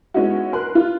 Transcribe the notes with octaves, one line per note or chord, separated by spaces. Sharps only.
G#3 B3 C#4 D#4 E4 F#4
A#4 B4 C6 F#6
F4